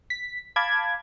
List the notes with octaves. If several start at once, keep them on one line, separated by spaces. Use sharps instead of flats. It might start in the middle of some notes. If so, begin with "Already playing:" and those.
B6
F5 A5 B5 D6 G#6